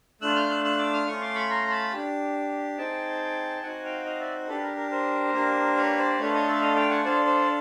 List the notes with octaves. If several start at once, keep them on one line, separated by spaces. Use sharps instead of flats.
A3 D4 F4 E6 F#6
F6 G6
E6 F#6
E6 F#6
D6 E6
D#6 F6
A3 C#4 F4 C#6 D#6
C6 D6
B5 C#6
A#5 C6
C6
A5 B5
D4 G4
C4 D#4 G#4 G5 A5
C4 D#4 F#4 F#5 G#5
F5 G5
D#5 F5
D5 E5
D4 G4 A4 B4
A#4
A#4
A#4 C5
A#3 D4 G4
B4 C#5
C5 D5
A3 D4 F4 A4 B4 C#5
C#5 D#5
D5 E5
D#5 F5
F5 G5
F#5 G#5
D4 F4 A4 C5 D5
C5 D5